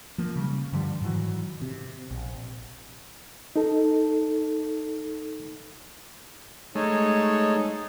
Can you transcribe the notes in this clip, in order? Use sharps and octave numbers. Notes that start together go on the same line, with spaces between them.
F3 A#3
C#3 G3
G2 D3 F3 G3
G#2 D#3 E3 F#3
C3
A#1
D#4 A4
G#3 A3 D#4 C#5